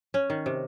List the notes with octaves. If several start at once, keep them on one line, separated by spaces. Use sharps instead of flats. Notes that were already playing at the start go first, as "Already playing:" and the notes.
C#4
D#3
C3